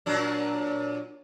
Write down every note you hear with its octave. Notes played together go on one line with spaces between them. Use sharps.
A#2 F#3 D4